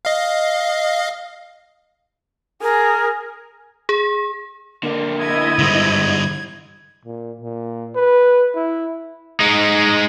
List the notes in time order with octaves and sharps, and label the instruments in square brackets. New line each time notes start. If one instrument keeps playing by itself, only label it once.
[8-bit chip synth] D#5 F5
[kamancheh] G#4 [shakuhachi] A#4
[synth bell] G#4
[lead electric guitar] D3 A#3 [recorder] D5
[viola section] E4 D#5 [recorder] G#6
[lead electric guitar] G#2 [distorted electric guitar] D3 G3
[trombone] A#2
A#2
B4
E4
[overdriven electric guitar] G#3 D#4